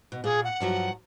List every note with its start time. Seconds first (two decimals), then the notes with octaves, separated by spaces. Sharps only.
0.12 B2
0.24 A#2 G#4
0.44 F#5
0.60 G2 F3 F#3